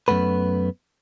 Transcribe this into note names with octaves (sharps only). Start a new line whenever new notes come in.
F#2 B2 A3 B3 B4